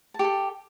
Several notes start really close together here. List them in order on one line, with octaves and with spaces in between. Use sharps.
A5 G4 A4